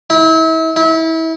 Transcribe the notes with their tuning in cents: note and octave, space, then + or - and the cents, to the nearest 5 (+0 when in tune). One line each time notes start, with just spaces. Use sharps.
E4 -35
E4 -30